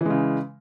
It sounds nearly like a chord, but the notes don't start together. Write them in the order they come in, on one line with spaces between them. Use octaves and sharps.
E3 G#3 C#3